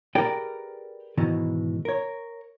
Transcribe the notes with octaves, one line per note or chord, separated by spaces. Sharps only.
G4 G#4 A#4 B4 D5 G5
G#2 B2 D#3 E3 G#3
A#4 C#5